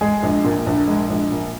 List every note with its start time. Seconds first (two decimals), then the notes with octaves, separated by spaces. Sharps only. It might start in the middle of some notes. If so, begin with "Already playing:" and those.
0.01 G#3 G#4
0.23 A#1
0.44 A#2
0.66 A#1
0.88 G#3
1.09 A#1
1.31 A#2